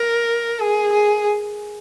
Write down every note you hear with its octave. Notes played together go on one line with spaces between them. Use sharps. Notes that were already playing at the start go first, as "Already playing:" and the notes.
Already playing: A#4
G#4
G#4